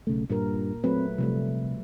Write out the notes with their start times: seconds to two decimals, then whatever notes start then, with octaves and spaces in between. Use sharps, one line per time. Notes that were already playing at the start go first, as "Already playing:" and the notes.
0.07 B1 C#3 A3
0.30 G2 A#2 A#4
0.84 F#3 A3 C4 B4
1.18 C3 F3 G3 A3